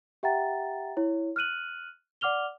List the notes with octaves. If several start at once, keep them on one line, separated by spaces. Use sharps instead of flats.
G4 E5 F#5 G5 A#5 A6
E4 C#5
F6 F#6 D#7 F#7
D5 F#5 D6 F6 F7 G7